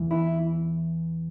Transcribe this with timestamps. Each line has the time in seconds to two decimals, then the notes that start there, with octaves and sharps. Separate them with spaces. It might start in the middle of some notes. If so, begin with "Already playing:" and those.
Already playing: E2 E3
0.11 E4